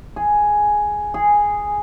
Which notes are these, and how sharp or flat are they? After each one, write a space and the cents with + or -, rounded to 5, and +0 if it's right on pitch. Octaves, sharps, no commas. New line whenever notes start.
G#4 +5
G#4 -5